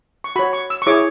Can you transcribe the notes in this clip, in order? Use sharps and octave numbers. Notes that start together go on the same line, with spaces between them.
C#6
F#4 C#5 B5
C#6
E6
C#6
E4 G#4 C#5 D6